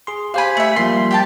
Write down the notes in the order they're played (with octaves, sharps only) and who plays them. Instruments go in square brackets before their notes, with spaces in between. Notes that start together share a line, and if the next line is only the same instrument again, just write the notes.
[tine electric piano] G#4 C6
[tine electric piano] G4 C5 G#5 [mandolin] F5 B5
[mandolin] A3 E5
[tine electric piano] F3 G3 A#3 [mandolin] C6
[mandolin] G4 G5 A5